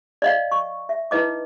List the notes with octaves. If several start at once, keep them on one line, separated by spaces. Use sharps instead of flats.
D5 D#5 F5
C#6
E5
D#4 E4 B4 D#5 D6